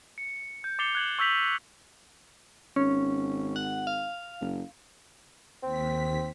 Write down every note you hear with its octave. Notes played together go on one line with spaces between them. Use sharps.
C#7
G6
D6 A6 C7 C#7 F7 G7
F#6 G#6 F#7
C#6 E6 G6 B6 F7 F#7
G#1 C#4
F#5
F5
F#1
D#2 C4 B6